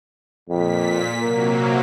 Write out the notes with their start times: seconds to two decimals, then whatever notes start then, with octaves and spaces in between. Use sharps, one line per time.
0.49 F2 A#2 B6
1.21 C3 F#3 A#3 A#4